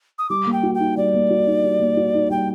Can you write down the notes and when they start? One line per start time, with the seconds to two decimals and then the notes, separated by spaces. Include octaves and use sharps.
0.19 D#6
0.30 G3 D6
0.46 A#3
0.53 G5
0.63 F#4
0.75 G5
0.80 D#4
0.97 G3 D5
1.14 A#3
1.30 F#4
1.47 D#4
1.64 G3
1.80 A#3
1.97 F#4
2.14 D#4
2.30 G3 G5